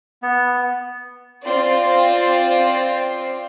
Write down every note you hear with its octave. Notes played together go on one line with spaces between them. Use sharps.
B3
C4 F4 C5 D5